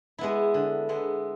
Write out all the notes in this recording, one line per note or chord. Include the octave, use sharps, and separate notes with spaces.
G#3 B3 E4
D3
G#3 B3 E4